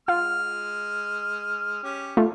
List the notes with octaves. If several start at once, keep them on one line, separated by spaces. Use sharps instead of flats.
G#3 F4 F6
C#4 G4
A3 F4